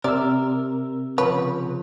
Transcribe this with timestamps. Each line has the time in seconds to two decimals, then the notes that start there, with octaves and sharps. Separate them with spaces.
0.04 C3 A#4 D5 E6
1.18 C#3 F3 B4 C#5